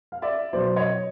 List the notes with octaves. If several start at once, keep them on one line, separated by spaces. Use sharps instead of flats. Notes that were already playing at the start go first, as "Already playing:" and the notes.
F5
D5 E5
B2 F#3 B3 C5 D5
C#5 D#5